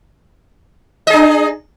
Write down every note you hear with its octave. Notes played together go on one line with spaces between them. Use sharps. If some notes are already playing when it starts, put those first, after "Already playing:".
D4 G#4 D#5